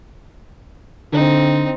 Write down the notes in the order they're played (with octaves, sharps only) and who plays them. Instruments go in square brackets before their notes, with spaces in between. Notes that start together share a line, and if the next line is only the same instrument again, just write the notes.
[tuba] D3 [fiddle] C4 D#4